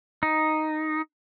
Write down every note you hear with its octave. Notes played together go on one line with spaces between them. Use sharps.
D#4